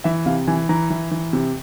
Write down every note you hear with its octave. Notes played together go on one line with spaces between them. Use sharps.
E3 E5
C3 F5
E3 G#5
E3 A#5
E3
E3
C3